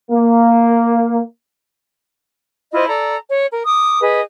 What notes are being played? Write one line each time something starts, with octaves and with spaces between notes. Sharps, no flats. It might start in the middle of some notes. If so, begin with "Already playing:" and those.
A#3
E4 F4 C5 D#5
A4 D5 A#5
C#5
A#4
D6 D#6
G#4 B4 D#5